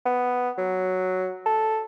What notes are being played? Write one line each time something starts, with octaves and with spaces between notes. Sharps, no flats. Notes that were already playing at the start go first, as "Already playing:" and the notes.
B3
F#3
A4